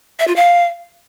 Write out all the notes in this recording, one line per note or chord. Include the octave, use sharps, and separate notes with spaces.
E5
F4
F5